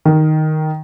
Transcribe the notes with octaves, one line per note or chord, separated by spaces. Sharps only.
D#3